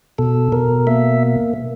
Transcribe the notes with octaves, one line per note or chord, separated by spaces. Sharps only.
B2 A4
B2 A#4
A#3 E5